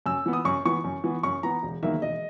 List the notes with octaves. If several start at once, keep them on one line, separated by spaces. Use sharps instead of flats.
F#2 E6
E3 B3
D#6
F#2 C#6
E3 B3 C#6
F#2
E3 B3
F#2 C#6
E3 B3 A#5
E1
E2 D#3 F#3 A#3 E5
E1 D#5